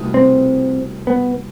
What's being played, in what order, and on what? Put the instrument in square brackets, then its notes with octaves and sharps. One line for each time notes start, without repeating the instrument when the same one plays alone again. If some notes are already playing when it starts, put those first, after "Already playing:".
Already playing: [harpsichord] C2 B2 A3 D#4
[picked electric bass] C4
B3